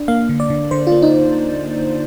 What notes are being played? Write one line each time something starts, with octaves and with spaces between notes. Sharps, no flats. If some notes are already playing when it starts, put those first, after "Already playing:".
Already playing: D4
A#3 F5
D3
D5
D3
D3 C5
F4
A#3
D#4